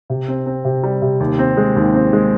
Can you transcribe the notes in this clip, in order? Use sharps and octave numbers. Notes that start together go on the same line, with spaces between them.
C3
C4
C4
C3
G3
C3
D#2
C4
G#3
D#2
C4
G#3